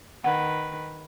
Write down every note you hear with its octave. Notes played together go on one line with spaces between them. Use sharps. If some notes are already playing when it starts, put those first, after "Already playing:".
D#3 B4 F#5